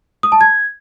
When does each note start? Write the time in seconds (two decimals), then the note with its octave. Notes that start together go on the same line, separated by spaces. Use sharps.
0.23 D#6
0.32 A5
0.41 G#6